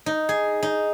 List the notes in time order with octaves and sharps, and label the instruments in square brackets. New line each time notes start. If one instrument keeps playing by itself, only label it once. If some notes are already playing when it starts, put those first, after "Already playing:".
[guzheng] D#4
G#4
D#4